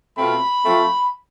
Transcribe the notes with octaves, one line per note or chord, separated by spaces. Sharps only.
B2 A3 C4 F4 B5
F3 A3 C4 F4